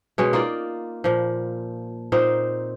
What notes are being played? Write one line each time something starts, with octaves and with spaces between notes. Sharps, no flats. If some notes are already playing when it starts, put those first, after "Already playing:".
B2 G#3 C#4
A#3 D#4 F4 D5
A#2 F3
A#2 C4 D#4 C5